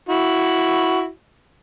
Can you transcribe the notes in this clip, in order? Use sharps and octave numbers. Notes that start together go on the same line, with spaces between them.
E4 F#4